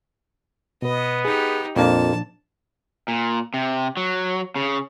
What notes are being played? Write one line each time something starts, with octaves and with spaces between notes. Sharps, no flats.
B2 B3 B4 D#5
D#4 G4 G#4
F2 A#2 F3 A#3 D4 A5
A#2
C3
F#3
C#3